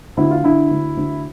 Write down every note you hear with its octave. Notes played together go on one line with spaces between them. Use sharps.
D2 E4
F4
D3 E4
D2
D2